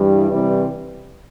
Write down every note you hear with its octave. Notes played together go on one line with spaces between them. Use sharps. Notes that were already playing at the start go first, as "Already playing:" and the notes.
Already playing: G2 E3 G3
C3 E3 G3